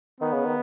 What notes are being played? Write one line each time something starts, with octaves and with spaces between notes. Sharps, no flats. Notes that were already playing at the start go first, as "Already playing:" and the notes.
D#3 B3
C#3
D#3